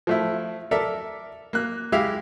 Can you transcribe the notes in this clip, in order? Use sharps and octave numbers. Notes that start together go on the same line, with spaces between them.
F3 A3 E4
A4 A#4 D5 E5
A#3 F#6
G#3 E4 G4 E5 F5